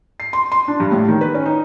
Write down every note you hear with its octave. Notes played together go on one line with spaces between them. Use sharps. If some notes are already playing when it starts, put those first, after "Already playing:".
C7
C6
C6
D4
G2
A2
D#3
B4
C#4
D#4